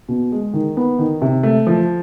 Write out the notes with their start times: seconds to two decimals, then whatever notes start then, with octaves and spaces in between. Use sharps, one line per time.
0.09 B2
0.32 G#3
0.54 D#3
0.77 B3
0.99 D#3
1.22 C3
1.43 A3
1.67 F3